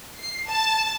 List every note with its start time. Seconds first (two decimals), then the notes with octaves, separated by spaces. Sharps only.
0.18 C7
0.48 A5